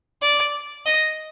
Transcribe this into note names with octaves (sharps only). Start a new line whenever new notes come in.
D5
D#5